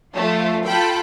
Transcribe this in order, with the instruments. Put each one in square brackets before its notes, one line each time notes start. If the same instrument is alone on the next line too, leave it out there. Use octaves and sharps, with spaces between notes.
[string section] F3 F4 [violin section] A3
[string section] F4 A4 B5 [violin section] G5